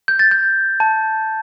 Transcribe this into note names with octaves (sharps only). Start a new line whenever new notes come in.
G6
A6
G6
A5